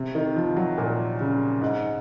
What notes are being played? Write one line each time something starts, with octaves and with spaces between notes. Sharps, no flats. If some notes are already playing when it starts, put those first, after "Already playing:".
Already playing: C3
D#3
F3
F#3
A#2
C#3
G#2